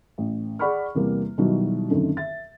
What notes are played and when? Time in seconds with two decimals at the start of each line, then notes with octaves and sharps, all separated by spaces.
0.18 A1
0.59 G#4 D5 F#5 B5 C#6 F6
0.95 E2 C3 G3 A#3
1.38 B2 D#3 F#3 G3 E4 F#4
1.90 F#2 D3 D#3 A3 C4 C#4
2.17 E5 A6